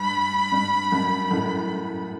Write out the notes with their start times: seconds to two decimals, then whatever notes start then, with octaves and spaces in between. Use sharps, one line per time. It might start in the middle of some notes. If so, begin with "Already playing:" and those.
Already playing: G2 B5
0.52 G2
0.92 F#2
1.31 F#2 A2